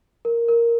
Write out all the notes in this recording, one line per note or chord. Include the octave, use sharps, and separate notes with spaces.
A#4
A#4